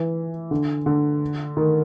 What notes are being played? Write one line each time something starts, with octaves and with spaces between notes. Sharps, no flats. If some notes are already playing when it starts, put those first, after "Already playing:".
Already playing: E3
D3
D3
D#3